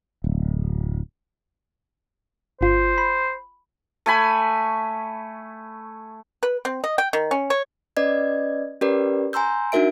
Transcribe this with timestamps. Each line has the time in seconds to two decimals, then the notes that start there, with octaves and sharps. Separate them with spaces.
0.24 D1
2.61 G1 F4 C5
2.98 B5
4.06 A3 G#5 B5
6.43 B4
6.65 C4
6.84 D#5
6.98 G5
7.13 D#3
7.31 C#4
7.50 C#5
7.97 C#4 B4 D5 D#5 G#6
8.81 C#4 G4 A#4 B4 D5
9.33 G#5 A#5 C6 E6 G6
9.72 D4 D#4 F#4 A#4 E5 D7